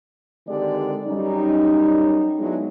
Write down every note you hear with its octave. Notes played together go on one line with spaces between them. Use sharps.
D3 D#3 G#3 C4 G4 D5
F#2 G3 C#4 D#4
F#3 G#3 B3 D4 E4 G#4